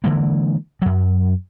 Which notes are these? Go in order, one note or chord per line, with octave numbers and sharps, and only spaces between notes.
D3 E3 G#3 A#3
F#2 F#3